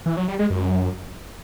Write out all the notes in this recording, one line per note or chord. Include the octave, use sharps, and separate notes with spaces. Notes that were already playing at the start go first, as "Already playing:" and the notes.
E3
F#3
G3
G#3
F#2